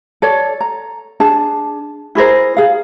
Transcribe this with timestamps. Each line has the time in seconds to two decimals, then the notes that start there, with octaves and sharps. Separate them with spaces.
0.22 A4 C#5 D5
0.61 A#5
1.20 D4 G#4 A5
2.15 E4 G#4 A#4 C5
2.57 G#4 F5